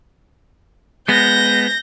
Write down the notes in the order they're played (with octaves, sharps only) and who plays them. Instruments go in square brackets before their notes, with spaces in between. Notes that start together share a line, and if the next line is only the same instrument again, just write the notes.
[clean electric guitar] G#3 B3 [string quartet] G6 A#6